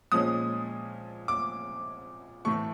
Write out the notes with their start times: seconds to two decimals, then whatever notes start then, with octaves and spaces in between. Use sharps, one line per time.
0.12 A#2 F3 G#3 C#4 D#6
1.28 D6
2.45 A2 E3 A3 C#6